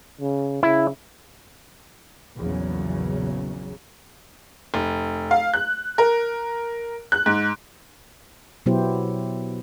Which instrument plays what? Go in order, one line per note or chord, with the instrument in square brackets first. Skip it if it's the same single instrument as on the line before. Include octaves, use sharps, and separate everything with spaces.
[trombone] C#3
[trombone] C#3 [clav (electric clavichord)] E4
[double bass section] A#1 E2 C#3 F#3
[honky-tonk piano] F1
F5
F#6
A#4
F#6
G#2
[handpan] B2 F#3 B3 E4 G4 C5